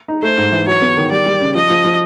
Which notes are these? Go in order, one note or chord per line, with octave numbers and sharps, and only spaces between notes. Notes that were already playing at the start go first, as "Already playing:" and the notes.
D#4
A3 C5
G#2
E3
F#3 C#5
B3
D#3
G3 D5
G3
C#3
F3 D#5
F3
F3